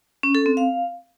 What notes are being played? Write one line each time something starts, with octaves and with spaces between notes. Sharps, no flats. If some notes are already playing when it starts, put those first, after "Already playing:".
C#4
A4
C4
F5